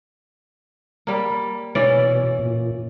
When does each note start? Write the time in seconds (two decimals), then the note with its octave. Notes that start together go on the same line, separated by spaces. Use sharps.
1.07 G3 A#3
1.75 B2 E3 C#4 D5
2.39 A#2